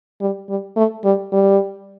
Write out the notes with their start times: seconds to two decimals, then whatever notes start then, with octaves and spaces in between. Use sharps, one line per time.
0.21 G3
0.49 G3
0.76 A3
1.04 G3
1.32 G3